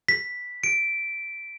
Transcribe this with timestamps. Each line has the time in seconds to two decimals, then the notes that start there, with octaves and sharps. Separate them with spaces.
0.09 B6
0.64 D7